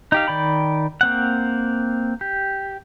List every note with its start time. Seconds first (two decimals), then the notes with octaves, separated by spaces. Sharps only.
0.12 D#4 G4 F5
0.28 D#3 D5 G5 B5
1.01 A#3 C4 F#5
2.21 G4